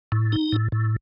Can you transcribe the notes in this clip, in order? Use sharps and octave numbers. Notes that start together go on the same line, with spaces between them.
A2
D#4
A2
A2